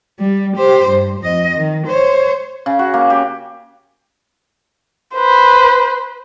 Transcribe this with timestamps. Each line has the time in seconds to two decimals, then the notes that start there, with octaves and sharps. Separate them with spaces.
0.19 G3
0.56 G4 C5
0.89 G2
1.20 F2 D#5
1.57 D#3
1.87 C5 C#5
2.66 C#3
2.79 F#4
2.94 A#3
3.10 G4
5.15 B4 C5